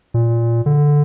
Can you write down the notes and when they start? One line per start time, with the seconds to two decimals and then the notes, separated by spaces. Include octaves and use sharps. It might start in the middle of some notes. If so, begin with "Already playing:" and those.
0.14 A#2
0.66 D3